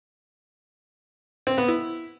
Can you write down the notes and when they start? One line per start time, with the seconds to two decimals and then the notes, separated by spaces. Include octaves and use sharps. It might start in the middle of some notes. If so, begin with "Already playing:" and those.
1.47 C4
1.58 B3
1.68 E4